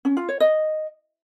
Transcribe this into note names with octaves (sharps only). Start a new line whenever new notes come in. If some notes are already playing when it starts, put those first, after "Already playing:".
C#4
F4
C#5
D#5